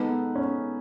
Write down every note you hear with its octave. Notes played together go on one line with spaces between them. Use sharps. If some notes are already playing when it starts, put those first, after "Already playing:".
Already playing: G#3 B3 D#4 A4 B4
C#4